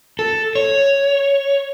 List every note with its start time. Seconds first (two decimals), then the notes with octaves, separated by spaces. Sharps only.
0.19 A4
0.55 C#5